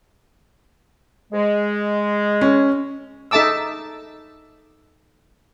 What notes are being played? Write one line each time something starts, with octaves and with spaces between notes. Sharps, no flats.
G#3
C#4
D#4 A4 E5 A5 D6 E6